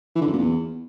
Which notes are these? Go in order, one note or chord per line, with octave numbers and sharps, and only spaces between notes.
E3
D3
F#2
A#2
E2